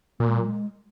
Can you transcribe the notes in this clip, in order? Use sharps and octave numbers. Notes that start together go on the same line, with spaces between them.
A#2 A#3
G#3
F#3
G#3